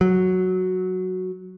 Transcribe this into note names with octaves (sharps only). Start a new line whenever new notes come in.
F#3